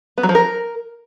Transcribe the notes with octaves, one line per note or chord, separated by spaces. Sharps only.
B3
F#3
F3
A#4